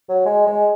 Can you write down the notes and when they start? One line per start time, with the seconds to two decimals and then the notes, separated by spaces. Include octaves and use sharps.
0.09 F#3
0.26 G#3
0.47 G#3